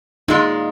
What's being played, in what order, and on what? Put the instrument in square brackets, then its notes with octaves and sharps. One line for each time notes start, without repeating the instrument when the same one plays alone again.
[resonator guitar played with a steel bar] A#2 G#3 F4 [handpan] D#4